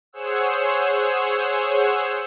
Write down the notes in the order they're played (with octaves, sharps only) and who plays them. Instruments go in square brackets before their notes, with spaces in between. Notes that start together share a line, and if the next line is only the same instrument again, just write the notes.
[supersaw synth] G#4 C5 C#5 F#5 E6